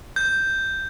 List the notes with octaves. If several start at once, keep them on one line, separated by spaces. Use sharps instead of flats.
G6